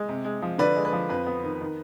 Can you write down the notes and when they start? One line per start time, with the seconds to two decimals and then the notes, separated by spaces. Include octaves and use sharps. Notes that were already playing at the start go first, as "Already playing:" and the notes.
Already playing: G#3
0.09 C3
0.25 G#3
0.42 F3
0.58 D3 B4 D5
0.76 G#3
0.85 B4
0.92 F3
1.09 F2 B4
1.27 B3
1.44 D#3
1.61 D#3